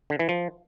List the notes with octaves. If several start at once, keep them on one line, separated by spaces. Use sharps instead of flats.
D3
E3
F3